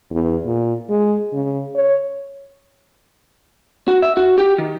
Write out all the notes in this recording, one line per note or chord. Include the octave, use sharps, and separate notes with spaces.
E2
A#2
G#3
C#3
C#5
F#4
E5
F#4
G4
D#3